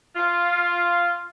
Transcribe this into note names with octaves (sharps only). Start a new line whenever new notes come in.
F4